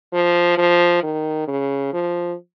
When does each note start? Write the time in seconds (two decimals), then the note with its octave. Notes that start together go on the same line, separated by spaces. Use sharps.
0.13 F3
0.58 F3
1.03 D#3
1.48 C#3
1.93 F3